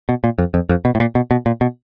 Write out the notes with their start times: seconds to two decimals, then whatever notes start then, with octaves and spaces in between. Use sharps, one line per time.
0.09 B2
0.24 A#2
0.38 F2
0.54 F2
0.69 F2
0.85 B2
0.95 A2
1.00 A#2
1.15 B2
1.31 B2
1.46 A#2
1.61 B2